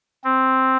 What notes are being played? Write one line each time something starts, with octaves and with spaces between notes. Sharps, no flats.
C4